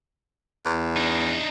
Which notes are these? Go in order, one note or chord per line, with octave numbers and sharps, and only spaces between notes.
E2
D4 D#4